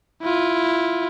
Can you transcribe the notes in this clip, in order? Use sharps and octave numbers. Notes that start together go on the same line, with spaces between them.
E4 F4